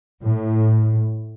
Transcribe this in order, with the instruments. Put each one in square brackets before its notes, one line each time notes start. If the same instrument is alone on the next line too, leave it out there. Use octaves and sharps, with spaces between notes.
[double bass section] A2